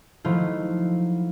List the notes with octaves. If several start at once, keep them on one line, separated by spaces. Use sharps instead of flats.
D#3 F3 F#3 A3 E4 F4